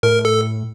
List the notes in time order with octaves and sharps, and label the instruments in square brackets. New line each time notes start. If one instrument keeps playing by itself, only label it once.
[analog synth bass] A2 [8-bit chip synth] A#4
[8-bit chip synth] A4